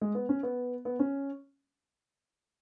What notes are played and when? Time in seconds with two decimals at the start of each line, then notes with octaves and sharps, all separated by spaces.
0.01 G#3
0.15 B3
0.29 C#4
0.43 B3
0.85 B3
0.99 C#4